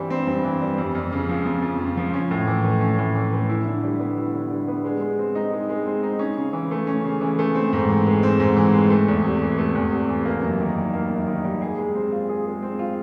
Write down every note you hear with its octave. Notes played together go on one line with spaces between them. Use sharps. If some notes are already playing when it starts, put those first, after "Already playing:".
Already playing: G2 E3 G3 C4
C4
G2
E3
G3
F2
F2
C#3
F3
F2
F2
C#3
F3
C#4
A2
E3
A3
C#4
A2
E3
A3
E4
D3
G3
B3
E4
D3
G3
B3
G#3
G#3
C4
D#4
G#3
G#3
C4
D#4
C#4
C#3
E3
A3
C#4
C#3
E3
A3
C4
G#2
E3
G#3
C4
G#2
E3
G#3
A3
E2
C3
E3
A3
E2
C3
E3
A#3
F#2
D#3
G3
A#3
F#2
D#3
G3
G#4
G#3
C4
F4
G#4
G#3
C4
F4